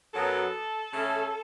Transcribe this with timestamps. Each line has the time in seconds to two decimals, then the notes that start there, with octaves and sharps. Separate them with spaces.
0.14 F#2 F#3 B3 A4
0.93 C#3 A3 C#4